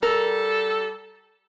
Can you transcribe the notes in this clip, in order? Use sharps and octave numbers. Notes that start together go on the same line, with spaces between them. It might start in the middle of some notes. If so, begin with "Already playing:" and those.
G3 A4 A#4